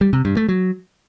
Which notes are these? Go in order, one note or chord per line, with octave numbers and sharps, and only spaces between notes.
G3
C3
G2
A3
F#3